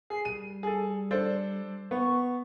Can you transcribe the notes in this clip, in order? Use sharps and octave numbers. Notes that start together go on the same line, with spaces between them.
G#4 C7
G3 D#7
G#4 A4
D4 A4 C5
B3 C#6